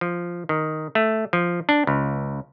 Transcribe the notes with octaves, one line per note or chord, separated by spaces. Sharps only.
F3
D#3
A3
F3
D4
C#2